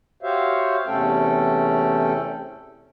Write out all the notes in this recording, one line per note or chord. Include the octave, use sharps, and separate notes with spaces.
F#4 G4 C5 C#5 E5 F5
E2 C3 A3 C#4 A4 G5